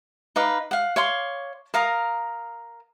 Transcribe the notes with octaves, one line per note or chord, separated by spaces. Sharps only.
D#4 B4 F5 D6
F5 F#5
C#5 F5 C6 D6
A#4 F5 A#5 D#6